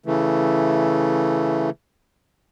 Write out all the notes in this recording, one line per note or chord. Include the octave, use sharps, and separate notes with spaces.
C#3 E3 A3